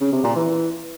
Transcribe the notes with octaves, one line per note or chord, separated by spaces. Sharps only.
C#3
C3
A#2
E3